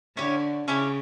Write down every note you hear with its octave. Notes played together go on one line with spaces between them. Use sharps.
D3 C#4 E4 G4 C#5
C#3 C#4 E4 G4 C#5